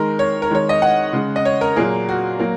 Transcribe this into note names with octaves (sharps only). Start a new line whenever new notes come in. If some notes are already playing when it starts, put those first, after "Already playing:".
Already playing: D#3 G#3 A#4
C#5
A#4
D#3 G#3 C#5
D#5
F#5
C#3 G#3
D#5
C#5
A#4
A#2 F#3 A#3 G#4
F#4
F#3 A#3